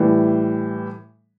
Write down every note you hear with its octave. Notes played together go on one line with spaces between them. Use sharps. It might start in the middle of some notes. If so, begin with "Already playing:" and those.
Already playing: A2 E3 G3